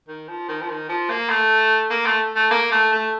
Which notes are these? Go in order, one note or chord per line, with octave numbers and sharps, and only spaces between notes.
D#3
F3
D#3
F3
D#3
F3
A#3
A3
A#3
A3
A3
A#3
A3
A3